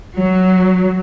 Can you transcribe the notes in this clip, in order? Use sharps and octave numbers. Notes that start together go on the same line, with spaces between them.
F#3